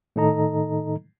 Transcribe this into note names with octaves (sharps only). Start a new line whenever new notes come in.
A2 D#3 D#4 A4 D#5 A#5